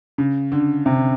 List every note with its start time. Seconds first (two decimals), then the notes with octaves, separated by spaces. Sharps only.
0.18 C#3
0.52 D3
0.86 C3